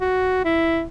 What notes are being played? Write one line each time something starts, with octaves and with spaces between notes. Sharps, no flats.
F#4
E4